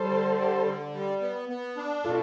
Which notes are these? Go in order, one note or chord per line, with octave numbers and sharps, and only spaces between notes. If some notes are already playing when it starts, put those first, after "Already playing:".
Already playing: G3 A4 C5
D3
G3
D3
G3
B3
B3
D4
B2 F4 A4